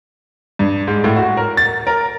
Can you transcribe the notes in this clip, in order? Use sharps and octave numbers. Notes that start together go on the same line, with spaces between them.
G2
G#2
A2
F#4
A#4
A6
A#4